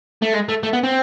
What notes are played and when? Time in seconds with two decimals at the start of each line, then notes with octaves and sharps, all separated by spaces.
0.22 A3
0.34 G#3
0.49 A3
0.63 A3
0.73 B3
0.84 C4